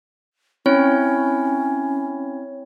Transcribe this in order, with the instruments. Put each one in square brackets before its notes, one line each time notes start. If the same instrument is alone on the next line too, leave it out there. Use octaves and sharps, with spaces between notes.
[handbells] C4 E4 C#5 [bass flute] C#4